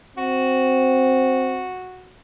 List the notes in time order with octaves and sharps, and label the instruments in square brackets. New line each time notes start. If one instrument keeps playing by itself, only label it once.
[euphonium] C4 [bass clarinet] F#4